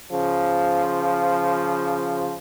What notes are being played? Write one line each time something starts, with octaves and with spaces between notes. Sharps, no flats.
C#3 F3